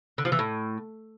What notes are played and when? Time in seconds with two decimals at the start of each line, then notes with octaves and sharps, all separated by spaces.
0.18 D3
0.25 F3
0.32 E3
0.39 A2